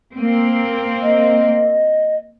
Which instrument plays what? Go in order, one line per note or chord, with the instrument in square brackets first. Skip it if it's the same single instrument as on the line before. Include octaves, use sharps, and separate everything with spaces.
[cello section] A#3 C4
[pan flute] D#5